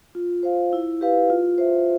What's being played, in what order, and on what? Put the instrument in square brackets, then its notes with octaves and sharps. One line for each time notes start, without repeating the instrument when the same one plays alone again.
[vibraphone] F4
C5 F5
E4
G4 B4 F5
F4
C5 E5